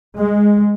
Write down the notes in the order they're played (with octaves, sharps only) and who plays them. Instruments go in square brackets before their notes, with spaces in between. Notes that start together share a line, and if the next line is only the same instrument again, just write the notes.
[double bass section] G#3